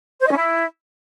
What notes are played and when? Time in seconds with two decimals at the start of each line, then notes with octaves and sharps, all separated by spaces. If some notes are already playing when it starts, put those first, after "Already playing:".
0.20 C5
0.26 D#5
0.31 C#4
0.37 E4